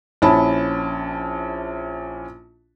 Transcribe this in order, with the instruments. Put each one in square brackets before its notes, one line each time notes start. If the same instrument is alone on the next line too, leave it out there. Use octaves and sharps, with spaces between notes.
[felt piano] A#1 C#4 E4 A5 B5